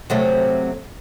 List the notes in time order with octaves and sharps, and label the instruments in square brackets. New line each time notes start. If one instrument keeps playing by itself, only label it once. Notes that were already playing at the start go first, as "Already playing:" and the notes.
[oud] C3 F#3 A3